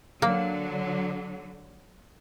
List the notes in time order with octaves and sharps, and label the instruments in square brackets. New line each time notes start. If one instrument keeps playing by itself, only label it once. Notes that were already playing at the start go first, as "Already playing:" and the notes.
[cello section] D3 F#3 [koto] A#3